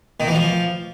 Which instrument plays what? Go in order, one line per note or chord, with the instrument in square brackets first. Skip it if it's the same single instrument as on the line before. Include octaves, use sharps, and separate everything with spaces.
[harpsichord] D#3
E3
F3